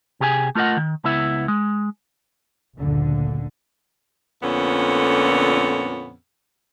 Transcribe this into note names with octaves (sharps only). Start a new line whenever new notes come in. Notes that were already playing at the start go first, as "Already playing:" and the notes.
C3 G4 G#4 C5 G#5
A3 F4 A#4 D#5 F#5
D#3
C#2 B3 E4 E5
G#3
F#1 D2 A#2 D3
F2 A#2 D3 B3 C#4